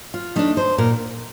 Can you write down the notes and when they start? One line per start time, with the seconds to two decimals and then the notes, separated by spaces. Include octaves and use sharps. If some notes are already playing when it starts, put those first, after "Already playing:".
0.14 F4
0.36 A3 D4 D#4
0.57 C5
0.78 A#2 A#4